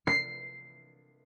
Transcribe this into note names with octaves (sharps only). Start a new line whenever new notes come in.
C7